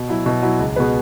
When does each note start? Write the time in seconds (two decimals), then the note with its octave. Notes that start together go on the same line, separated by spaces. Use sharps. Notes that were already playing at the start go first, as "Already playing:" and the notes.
Already playing: B2
0.09 F#3 E4
0.26 B2
0.42 F#3 E4
0.59 C#2
0.76 B2 B3 G#4 B4